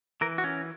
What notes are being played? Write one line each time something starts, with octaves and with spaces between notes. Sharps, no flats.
E3 A#4
F#4
C#4